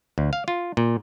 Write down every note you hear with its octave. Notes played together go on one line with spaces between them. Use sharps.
D2
F5
F4
A#2